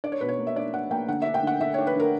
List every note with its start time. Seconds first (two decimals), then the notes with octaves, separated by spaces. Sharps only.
0.04 D4 D5
0.12 C#5
0.21 B2 B4
0.29 C#5
0.39 A#3
0.47 E5
0.56 D4 D5
0.73 D4 F#5
0.91 A#3 G5
1.08 D3 F#5
1.22 D4 E5
1.34 G5
1.43 D3 F#5
1.61 D3 E5
1.74 D4 C#5
1.87 B4
1.96 D3 A#4